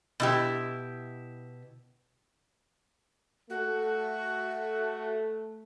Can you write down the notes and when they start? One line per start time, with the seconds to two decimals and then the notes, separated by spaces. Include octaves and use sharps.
0.20 B2 E4 G4
3.50 A3 F#4